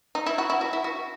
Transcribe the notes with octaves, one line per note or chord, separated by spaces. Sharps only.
D#4
E4
F#4
E4
F#4
E4
F#4